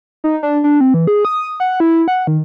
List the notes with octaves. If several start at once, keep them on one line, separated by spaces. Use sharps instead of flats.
D#4
D4
D4
C4
E3
G#4
D#6
F#5
E4
F#5
D#3